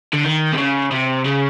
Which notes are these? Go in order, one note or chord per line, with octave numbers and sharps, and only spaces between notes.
D3
D#3
C3
C#3
C3
C#3